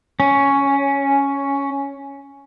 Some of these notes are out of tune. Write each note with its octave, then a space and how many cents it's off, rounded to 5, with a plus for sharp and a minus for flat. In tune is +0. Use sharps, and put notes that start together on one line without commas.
C#4 +5